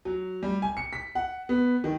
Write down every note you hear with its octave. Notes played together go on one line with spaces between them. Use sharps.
F#3
G3
G#5
C#7
B6
F#5
B3
D#3